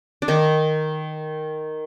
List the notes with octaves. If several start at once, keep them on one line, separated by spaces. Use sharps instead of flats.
D4
D#3 D#4